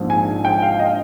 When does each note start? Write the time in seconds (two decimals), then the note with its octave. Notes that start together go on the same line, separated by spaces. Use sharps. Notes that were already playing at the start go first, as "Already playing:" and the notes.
Already playing: A#1 G#2 F3 C4
0.10 G#5
0.45 G5
0.62 F5
0.79 D#5